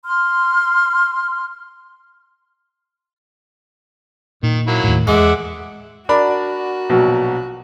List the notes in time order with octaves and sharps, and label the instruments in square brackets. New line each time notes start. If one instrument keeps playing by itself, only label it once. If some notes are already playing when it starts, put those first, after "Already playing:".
[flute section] C6 F6
[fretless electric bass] A#2 [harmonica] D#3
[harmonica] F#3 A#3 E4
[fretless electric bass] D#2 A2
[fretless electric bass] E2 [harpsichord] G#3 [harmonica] E5 F#5 D6
[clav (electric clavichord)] D4 [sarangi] F#4 [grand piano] A#4 D5 B5
[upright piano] A#1 B2 F#3